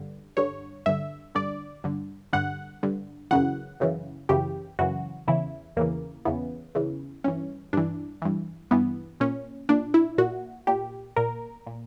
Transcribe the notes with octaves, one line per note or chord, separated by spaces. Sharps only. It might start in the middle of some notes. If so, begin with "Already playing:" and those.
Already playing: G2 D3
G2 D3 C#5
G2 D3 E5
G2 D3 D5
G2 D3
G2 D3 F#5
G2 D3
F#2 C#3 E3 F#5
F#2 C#3 E3
F#2 C#3 E3 G4
F#2 C#3 E3 F#4
E2 C#3 E3 E4
E2 C#3 E3 A#3
E2 C#3 E3 B3
E2 C#3 E3
G2 E3 C#4
G2 E3 D4
G2 E3
G2 E3 B3
A#2 C#4
A#2 D4
E4
A#2 F#4
A#2 G4
A#2 A#4
A#2